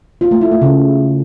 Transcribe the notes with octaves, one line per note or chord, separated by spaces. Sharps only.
F4
A3
E4
A3
C#3